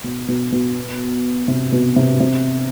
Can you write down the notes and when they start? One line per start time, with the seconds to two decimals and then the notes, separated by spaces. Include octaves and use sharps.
0.04 B2
0.28 B2
0.52 B2
1.48 C3
1.72 B2
1.96 C3
2.20 C3